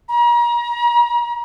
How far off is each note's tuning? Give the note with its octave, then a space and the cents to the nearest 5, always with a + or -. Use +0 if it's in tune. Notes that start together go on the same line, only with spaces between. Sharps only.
A#5 +35